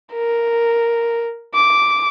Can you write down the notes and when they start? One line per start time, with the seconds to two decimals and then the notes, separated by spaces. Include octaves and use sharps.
0.13 A#4
1.55 D6